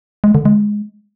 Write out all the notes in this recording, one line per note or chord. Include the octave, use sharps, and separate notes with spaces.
G#3
D3
G#3